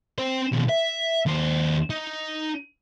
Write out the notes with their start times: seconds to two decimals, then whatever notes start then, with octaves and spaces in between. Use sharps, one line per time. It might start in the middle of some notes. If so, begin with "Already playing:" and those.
0.19 C4 C5
0.53 D#2 B2
0.69 E5
1.26 D#2 C5
1.90 D#4